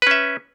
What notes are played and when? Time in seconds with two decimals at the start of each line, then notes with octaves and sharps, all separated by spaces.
0.02 B4
0.07 C#4
0.11 E5